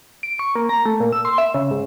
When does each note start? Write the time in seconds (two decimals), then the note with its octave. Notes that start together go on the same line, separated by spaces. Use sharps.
0.23 D7
0.39 C#6
0.55 A#3
0.69 A#5
0.86 A3
1.00 A#2
1.12 E6
1.25 C6
1.38 E5
1.54 C#3
1.71 G#2